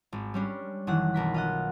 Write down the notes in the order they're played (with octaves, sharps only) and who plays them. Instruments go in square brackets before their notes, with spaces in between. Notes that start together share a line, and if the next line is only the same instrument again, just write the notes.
[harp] G#1
G3 C#4 D4
F#1 D#3 E3 F#5
B1 A#4 B6
F4 D#5 F#5